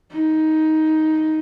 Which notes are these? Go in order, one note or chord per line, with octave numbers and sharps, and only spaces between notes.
D#4